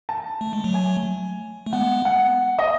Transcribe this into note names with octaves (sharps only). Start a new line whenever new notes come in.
A5
A3
G#3
F#3 A3
G#5
A3
G#3 B3 F#5
F#5
D#5